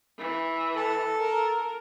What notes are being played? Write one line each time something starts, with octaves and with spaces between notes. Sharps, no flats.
E3
A4
A#4